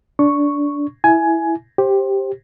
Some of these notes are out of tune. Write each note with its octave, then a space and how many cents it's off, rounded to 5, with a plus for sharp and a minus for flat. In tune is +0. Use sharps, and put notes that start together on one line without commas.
D4 -15 C#6 +0
E4 +0 G#5 +15
G4 +0 C5 +20